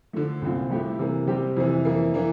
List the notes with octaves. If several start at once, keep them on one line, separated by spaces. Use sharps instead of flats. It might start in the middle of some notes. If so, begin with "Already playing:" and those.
D3 F3 A3
C2 A#2 F3 C4 F4
G2 F3 A3 E4 G4
C3 E3 A#3
C3 G3 C4 G4
F2 C3 E3
F2 E3 A#3
E3 A#3 D4